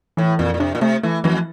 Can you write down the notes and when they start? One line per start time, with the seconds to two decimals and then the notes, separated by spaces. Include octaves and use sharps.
0.17 A2 E3
0.39 F2 A#2
0.54 A#2
0.60 C3 D4
0.75 A#2
0.81 C3 A3
1.03 E3 A3
1.24 F2 E3